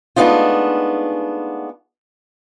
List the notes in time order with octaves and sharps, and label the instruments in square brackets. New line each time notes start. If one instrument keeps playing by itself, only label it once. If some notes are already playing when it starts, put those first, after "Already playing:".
[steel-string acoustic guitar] G#3 A3 B3 D4 D#4 F4